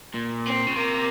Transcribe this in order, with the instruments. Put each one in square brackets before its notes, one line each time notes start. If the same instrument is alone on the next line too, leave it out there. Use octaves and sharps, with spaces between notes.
[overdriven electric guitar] A#2
[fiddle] C4
[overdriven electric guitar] C#3
[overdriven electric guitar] C3 [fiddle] A#3